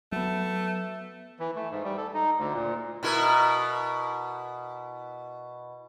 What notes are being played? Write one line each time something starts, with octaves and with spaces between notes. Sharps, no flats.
F#3 A3 B3
E3
A3
G#2
G3
A4
D#4
D2
A#2
B2 E4 A#4